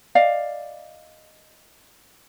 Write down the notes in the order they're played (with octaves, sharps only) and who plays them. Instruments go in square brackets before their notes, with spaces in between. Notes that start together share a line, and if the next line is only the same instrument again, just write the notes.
[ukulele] D5 D#5 F5